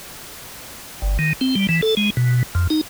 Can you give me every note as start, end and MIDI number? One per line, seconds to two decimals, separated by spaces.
1.02 1.18 31
1.19 1.33 51
1.41 1.55 60
1.56 1.67 55
1.69 1.81 52
1.82 1.95 69
1.97 2.10 56
2.17 2.43 47
2.55 2.67 41
2.70 2.81 63